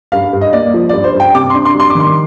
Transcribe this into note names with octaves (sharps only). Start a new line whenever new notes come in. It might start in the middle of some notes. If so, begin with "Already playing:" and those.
G2 F5
G2
D#5
A#3 D5
F3
D5
G2
C5
G2
G5
C3 D6
C6
D4
C6
G3
C6
D6
D#3 C6